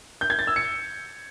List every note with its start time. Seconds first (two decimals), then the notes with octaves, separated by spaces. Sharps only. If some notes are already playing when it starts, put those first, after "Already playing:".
0.21 G6
0.30 G#6
0.39 A6
0.47 E6
0.56 C#7